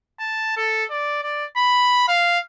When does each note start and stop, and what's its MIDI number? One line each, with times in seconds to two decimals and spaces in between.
0.20 0.54 81
0.57 0.84 69
0.91 1.23 74
1.23 1.45 74
1.57 2.07 83
2.08 2.39 77